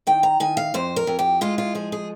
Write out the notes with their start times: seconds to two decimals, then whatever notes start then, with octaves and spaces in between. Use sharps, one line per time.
0.07 D#3 G5
0.23 A#5
0.40 D#3 G#5
0.57 F5
0.74 F2 C5
0.96 A#4
1.07 F2
1.19 G4
1.41 G#3 F4
1.58 F4
1.75 F3 G#4
1.92 G#4